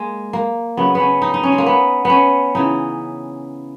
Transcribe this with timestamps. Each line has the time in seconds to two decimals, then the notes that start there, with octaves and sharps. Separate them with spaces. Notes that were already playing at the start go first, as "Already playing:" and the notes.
Already playing: G#3 A#3
0.33 A#3
0.77 C#3 F#3 B3
0.95 B3
1.00 C#4
1.22 D#4
1.34 D#4
1.44 C#4
1.52 G#3
1.58 A#3
1.66 B3
2.05 B3 C#4
2.55 C#3 E3 D#4